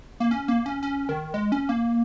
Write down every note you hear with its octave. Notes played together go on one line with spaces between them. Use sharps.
A#3
C#4
A#3
C#4
C#4
D#3
G#3
C#4
A#3